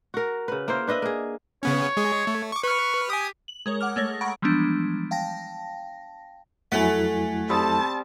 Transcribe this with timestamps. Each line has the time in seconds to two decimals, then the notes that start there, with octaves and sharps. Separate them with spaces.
0.14 F#4 A#4
0.48 C#3 B4
0.68 A#3 E4 A#4 C5
0.87 D4 B4 D#5 E5
1.02 A#3 G#4
1.63 C#3 B3 C#4 C#5
1.97 G#3 G#4
2.27 A3
2.52 C#6 D6
2.63 B4 C#6 F6
3.10 G4 G#5 D#6
3.48 F#7
3.66 G#3 A#4 C#5
3.81 F#5 D6 F6
3.96 G#3 A3 C#5 A#6
4.21 F#5 A#5 B5 C#6 A#6 D7
4.42 E3 F3 G3 G#3 B3 D4
5.11 F5 G5 A5 A#6
6.72 F2 F#3 A3 E4 F#5 G#5
7.49 G3 C4 A5 D#6